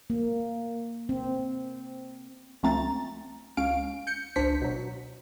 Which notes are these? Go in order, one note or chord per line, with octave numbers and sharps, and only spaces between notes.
A#3
C4
C#2 F3 A3 C4 A#5 A6
C#2 C#4 F5 D7
G6 C#7
G#1 C#2 D4 C5 B6 C#7
B2 F#3